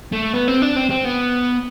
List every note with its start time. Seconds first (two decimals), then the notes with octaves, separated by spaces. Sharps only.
0.12 A3
0.34 B3
0.48 C4
0.62 D4
0.76 C4
0.90 C4
1.05 B3